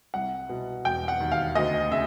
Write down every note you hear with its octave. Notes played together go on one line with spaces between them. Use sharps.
C2 F#5
B2
E1 G5
F#5
D#2
F5
D2 D#5
C#3 E5